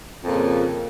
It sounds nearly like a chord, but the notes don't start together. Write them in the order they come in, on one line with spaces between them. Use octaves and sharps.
F2 A#2 C#3